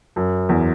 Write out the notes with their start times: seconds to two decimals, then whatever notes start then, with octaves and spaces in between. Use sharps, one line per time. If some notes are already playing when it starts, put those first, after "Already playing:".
0.16 F#2
0.49 E2